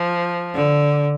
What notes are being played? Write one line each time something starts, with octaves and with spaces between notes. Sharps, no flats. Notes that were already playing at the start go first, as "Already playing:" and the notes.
Already playing: F3
D3